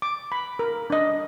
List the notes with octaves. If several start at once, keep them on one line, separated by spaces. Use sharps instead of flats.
D6
B5
A#4
D4 D#5